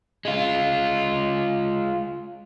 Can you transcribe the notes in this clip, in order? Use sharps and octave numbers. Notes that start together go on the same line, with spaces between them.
G#3 F4